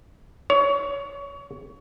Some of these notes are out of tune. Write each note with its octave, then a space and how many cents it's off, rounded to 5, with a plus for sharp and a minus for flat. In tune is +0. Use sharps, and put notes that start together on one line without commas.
C#5 +25